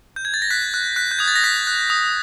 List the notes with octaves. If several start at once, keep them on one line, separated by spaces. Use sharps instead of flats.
G6
G#6
A6
A#6
F#6 B6
F#6
F#6 B6
G6
D#6 G#6
A6
A#6
F#6 B6
F#6
D#6